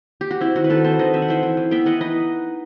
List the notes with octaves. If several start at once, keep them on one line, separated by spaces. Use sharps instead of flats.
G4
F#4
C4 E4
D#3 F#4
B4
D#3 F#4 A4
C4 A4 C5
D#3 B4 D#5
C4 E5
F#5
E3 C5 E5
E3
E3
B3 E5 G5
E3 D#5 F#5
D#4 B4 D#5